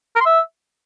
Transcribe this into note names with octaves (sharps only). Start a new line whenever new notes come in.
A#4
C6
E5